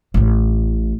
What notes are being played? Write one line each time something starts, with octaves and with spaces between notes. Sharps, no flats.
A1 A2